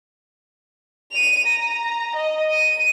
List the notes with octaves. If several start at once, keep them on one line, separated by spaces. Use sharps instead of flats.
D#7 F7
A#5
D#5
D#7